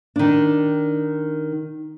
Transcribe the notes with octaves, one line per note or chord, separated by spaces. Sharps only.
D#3 D4